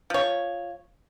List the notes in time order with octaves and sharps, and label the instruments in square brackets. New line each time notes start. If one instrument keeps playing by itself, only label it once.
[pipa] F3 C#5